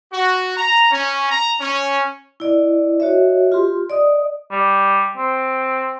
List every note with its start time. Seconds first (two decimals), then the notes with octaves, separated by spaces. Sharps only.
0.12 F#4
0.57 A#5
0.91 C#4
1.29 A#5
1.60 C#4
2.40 E4 D5 D#5
3.00 F#4 C#5 D#5 E5
3.52 F4 G4 C6
3.90 D5 D#5 D#6
4.51 G3
5.17 C4